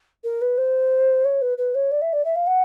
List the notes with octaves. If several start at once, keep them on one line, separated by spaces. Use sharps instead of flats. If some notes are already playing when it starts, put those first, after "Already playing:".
A#4
B4
C5
C#5
B4
B4
C#5
D5
E5
D5
E5
F5
F#5